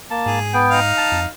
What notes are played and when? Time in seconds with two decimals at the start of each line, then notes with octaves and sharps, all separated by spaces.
0.10 A#3 A5
0.26 G#2 G#4
0.53 B3 G5
0.71 D#4 F5
0.97 A5
1.12 F2